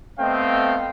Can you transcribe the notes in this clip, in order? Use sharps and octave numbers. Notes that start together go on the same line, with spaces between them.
A3 B3 C4 D#5 F5 G5